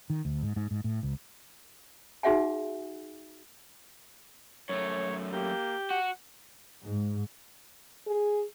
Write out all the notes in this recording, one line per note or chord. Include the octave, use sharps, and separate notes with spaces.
D#3
D2
G#2
G#2
G#2
A2
C#2
D#4 F#4 G#4 E5 F#5 G#5
F#2 A3 C#5
A#3 G4 G6
F#4 F#5
G#2
G#4